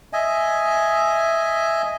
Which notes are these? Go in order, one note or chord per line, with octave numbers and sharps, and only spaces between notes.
D#5 E5 G#5